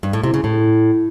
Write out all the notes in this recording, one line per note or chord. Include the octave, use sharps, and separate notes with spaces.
G2
A2
C3
C#3
A2